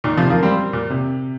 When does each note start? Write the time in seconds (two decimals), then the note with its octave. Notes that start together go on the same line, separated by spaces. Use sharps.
0.04 A#2 D#3
0.17 C3 F3
0.30 F3 A#3
0.43 G3 C4
0.73 A#2
0.90 C3